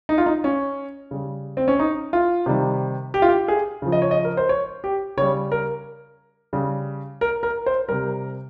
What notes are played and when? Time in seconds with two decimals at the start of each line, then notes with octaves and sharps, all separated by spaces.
0.09 D#4
0.18 F4
0.26 D#4
0.44 C#4
1.11 C#3 G3
1.57 C4
1.68 C#4
1.79 D#4
2.13 F4
2.46 C3 D#3 G3
3.14 G4
3.22 F4
3.28 G4
3.48 G#4
3.82 C#3 F3
3.92 D#5
4.02 C#5
4.11 D#5
4.25 A#4
4.37 C5
4.49 C#5
4.84 G4
5.17 C#3 G3 C#5
5.52 A#4
6.53 C#3 G3
7.21 A#4
7.43 A#4
7.66 C5
7.89 C3 G3 A#4